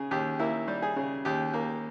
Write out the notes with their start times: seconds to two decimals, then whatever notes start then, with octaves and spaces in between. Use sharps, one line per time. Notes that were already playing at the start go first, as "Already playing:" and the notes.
Already playing: C#3 G#4
0.11 D#2 G4
0.39 A#3 E4
0.68 G3
0.82 G#4
0.96 C#3
1.25 D#2 G4
1.53 A#3